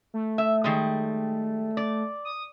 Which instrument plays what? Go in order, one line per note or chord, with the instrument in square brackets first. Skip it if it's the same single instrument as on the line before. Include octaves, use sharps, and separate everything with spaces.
[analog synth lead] A3
[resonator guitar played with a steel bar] E5
D#3 G3 G#3
D5
[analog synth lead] D#6